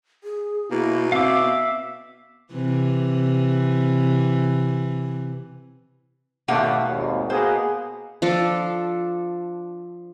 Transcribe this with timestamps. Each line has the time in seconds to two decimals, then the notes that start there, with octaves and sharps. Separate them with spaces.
0.24 G#4
0.71 B2 A#3 E4
1.12 C4 E5 F5 D6
1.44 B3
2.52 C3 E3
6.48 G#1 B2 A3 A#3 F#5
6.88 G#1 D#2
7.30 B2 A#3 G#4 C5
8.22 F3 D4 A4